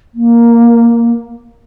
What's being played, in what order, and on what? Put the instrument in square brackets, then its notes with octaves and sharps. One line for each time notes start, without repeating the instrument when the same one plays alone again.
[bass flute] A#3